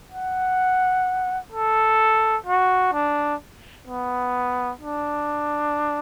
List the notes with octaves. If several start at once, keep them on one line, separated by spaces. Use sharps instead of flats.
F#5
A4
F#4
D4
B3
D4